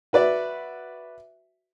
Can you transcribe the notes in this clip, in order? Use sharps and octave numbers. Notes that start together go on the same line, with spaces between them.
F#4 B4 D5 E5